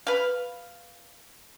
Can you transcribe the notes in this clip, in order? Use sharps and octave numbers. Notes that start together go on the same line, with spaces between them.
B4 F5